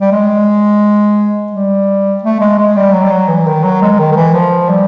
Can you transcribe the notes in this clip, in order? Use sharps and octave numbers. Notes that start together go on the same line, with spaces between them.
G3
G#3
G3
A3
G#3
G#3
G3
F#3
G3
F#3
E3
D#3
F#3
G#3
D#3
D#3
E3
F3
G3